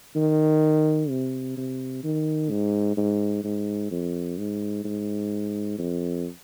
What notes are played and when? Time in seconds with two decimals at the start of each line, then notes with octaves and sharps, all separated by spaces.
0.16 D#3
1.09 C3
1.57 C3
2.04 D#3
2.50 G#2
2.97 G#2
3.44 G#2
3.91 F2
4.38 G#2
4.84 G#2
5.78 F2